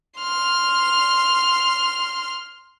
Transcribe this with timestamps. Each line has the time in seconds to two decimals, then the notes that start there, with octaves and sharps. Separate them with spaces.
0.19 C6 F6